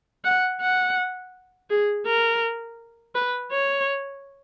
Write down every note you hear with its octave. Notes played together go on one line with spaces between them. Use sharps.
F#5
F#5
G#4
A#4
B4
C#5